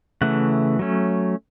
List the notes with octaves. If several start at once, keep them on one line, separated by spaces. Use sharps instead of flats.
C#3 E3 A3 F#5
F#3 A3 C#4